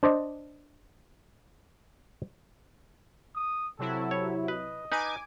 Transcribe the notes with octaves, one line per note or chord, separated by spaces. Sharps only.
D4 C5 D5 D#5
D#6
C3 F#3 E4 A4
C#5
B4 D#5
D#4 B4 G#5 D6